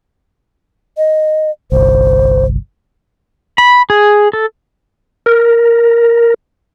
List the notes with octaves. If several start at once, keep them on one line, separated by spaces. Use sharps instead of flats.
D#5
G1 C2 C5
B5
G#4
A4
A#4